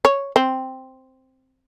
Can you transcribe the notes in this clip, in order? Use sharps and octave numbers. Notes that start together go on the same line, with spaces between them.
C#5
C4